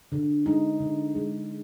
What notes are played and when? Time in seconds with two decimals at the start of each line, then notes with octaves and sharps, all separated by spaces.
0.12 D3
0.46 G#3 D#4
0.80 D3
1.15 G#3